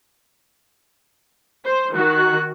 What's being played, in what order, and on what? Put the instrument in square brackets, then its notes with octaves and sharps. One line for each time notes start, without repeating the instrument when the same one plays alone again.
[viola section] C5
[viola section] D#3 F#4 [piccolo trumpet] F#6